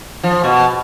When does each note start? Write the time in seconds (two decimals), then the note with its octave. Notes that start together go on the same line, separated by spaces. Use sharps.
0.24 F3
0.44 B2